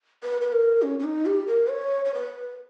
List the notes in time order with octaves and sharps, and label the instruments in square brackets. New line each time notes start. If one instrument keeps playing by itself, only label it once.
[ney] B4
B4
A#4
C#4
C#4
D#4
G4
A#4
C#5
C#5
B4